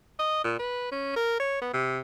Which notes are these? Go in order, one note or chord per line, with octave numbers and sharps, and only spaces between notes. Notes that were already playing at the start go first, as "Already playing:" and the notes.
D#5
A#2
B4
C#4
A#4
C#5
B3
C3